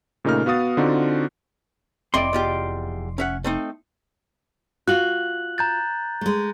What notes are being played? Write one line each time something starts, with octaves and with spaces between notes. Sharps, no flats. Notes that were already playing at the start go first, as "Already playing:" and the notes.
A#2 C#3 A3 D#4 A#4 F6
B3 F#4 F5 D#6 A6
D3 C4 D4 D#4 F4 F#4
F1 C4 E4 D5 D#5 C6 D6
E2 F4 G4
C#4 E5 F#5
A3 C4 D#4
F4 F#4 F#6 F#7
A#5 G6 A6
G#3 A3